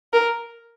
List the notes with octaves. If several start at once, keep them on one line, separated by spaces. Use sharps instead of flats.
A#4